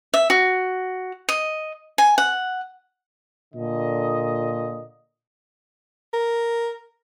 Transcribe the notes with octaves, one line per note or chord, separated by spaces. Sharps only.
E5
F#4
D#5
G#5
F#5
A#2 D3 D#5
A#4